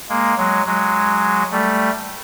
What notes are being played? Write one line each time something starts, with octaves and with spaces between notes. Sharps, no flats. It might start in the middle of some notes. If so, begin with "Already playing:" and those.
G#3 A#3
F#3 G#3
F#3 G#3
G3 A3